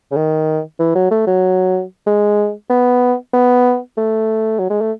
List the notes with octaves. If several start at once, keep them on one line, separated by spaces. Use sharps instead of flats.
C#3
D#3
E3
F#3
A3
F#3
G#3
B3
B3
A3
F#3
G#3
A3